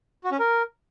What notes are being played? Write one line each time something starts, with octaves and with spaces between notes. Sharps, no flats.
F#4
C#4
A#4